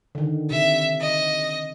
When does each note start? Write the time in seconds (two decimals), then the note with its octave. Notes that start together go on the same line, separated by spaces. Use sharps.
0.15 D3 D#3
0.51 C3 E5
1.01 D#5